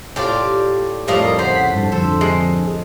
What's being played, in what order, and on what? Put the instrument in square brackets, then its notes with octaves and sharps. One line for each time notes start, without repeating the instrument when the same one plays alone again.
[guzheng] A2 F4 [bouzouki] G4 D5
[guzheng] F2 A2 A3 [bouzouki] G3 F4 D#5 [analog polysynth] A#4
[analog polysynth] C#3 F#5 B6 [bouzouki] C5
[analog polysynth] G2 A5
[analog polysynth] F2 D3 [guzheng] A4 C5
[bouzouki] G#3